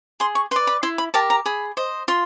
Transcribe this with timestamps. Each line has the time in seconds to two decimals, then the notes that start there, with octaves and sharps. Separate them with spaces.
0.20 G#4 C6
0.35 C#6
0.51 B4 C6
0.56 D5
0.67 B5
0.83 E4 C6
0.98 B5
1.14 G4 A#4 A5
1.30 A#5
1.46 G#4 B5
1.77 C5 D#5
2.08 F4 C6